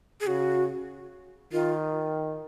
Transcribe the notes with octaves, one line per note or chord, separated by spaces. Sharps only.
G#4
C#3 F#4
D#3 F4